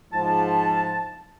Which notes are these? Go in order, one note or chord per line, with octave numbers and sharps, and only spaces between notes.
G#2 F3 A5